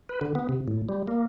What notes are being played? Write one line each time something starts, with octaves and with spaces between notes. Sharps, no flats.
B4
D3
B3
C3
A2
G3
A#3